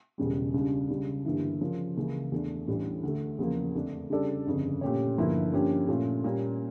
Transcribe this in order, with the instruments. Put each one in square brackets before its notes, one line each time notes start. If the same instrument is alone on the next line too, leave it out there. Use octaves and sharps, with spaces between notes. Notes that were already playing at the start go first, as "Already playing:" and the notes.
[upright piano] E1 E2 C#3 G3
C#2 C#3 G3 D4
C#2 C#3 G3 D4
G1 G2 E3 A#3 E4
C#3 F3 C#4 F4 A#4
C#2 C#3 E3 A#3 E4
E2 D3 A3 D4
A1 A2 E3 G3 D4
D2 D3 A3
E2 C#3 F3 A#3
F2 D3 A3 D4
C#3 G3 D4 A4 D5
G1 F2 C#3
A#2 A3 C#4 G4 C#5
G1 G2 F3 A#3 E4
G2 F3 A#3 C#4 G4
A#2 A3 C#4 F4
A#2 G3 A#3 C#4